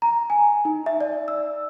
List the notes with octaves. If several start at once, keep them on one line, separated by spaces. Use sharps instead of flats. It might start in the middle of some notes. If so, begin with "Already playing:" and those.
A#5
G#5
D#4
E5
D5
E6